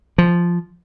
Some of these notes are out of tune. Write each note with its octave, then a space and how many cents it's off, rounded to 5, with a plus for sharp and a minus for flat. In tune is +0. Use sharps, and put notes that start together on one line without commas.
F3 -5